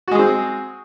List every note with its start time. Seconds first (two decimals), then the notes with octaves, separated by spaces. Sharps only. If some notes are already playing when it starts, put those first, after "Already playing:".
0.08 F#4
0.11 G#3
0.15 G#4
0.19 C4